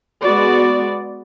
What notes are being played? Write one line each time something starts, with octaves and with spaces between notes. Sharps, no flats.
G#3 B3 F#4 D5